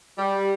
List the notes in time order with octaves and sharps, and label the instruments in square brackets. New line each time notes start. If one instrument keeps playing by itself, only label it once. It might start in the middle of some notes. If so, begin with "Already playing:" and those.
[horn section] G3